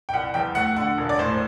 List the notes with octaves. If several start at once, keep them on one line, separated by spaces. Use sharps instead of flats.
G5
C2 F#5
E2 G5
A3 F#5
D3 F#5
E1
D5
A2 C5